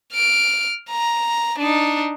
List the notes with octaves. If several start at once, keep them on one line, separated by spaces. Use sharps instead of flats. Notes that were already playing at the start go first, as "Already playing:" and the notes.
F6 D7
A#5
D4 D#4